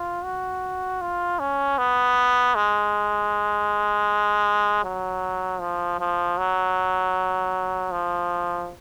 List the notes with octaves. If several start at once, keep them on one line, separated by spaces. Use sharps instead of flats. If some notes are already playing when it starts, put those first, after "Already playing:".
Already playing: F4
F#4
F4
C#4
B3
G#3
F#3
F3
F3
F#3
F3